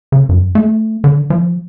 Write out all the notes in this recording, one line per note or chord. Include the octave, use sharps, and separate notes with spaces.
C#3
F#2
A3
D3
F3